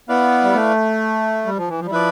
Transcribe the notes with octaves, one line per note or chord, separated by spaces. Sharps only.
B3 E4 B4 D5 F5
G3
A3
G3
F3
E3
F3
G3
F3 E4 B4 D5